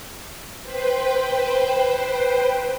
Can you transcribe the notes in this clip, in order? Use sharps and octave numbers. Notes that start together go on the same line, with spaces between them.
B4 C5 G5